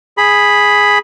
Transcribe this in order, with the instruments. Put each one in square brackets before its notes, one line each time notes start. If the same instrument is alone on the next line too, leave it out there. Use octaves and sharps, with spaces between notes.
[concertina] G#4 B5